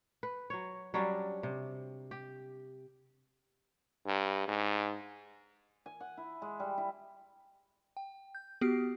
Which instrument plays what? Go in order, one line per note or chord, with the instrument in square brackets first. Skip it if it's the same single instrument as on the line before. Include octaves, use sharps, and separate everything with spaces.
[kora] B4
F#3 C#5
F#3 G3 C#4 D4
C3
G4
[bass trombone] G2
G#2
[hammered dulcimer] G#5
F#5
E4
G#3
G3
E4
[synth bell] G5
G6
B3 F#4 G4 F6 C7 D7